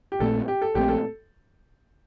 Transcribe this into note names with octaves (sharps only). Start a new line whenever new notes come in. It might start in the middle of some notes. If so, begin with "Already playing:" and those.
G4
A#1 A#2 A3 C4 A4
G4
A4
A#1 A#2 A3 C4 G4
A4